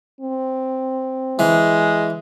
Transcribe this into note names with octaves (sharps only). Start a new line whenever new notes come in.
C4
E3 G#3